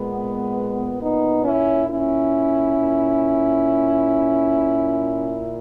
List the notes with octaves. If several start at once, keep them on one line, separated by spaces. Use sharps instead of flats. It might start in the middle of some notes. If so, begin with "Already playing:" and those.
Already playing: A#2 G#3 B3
B3 D#4
C#4 E4
C#4 E4
A#2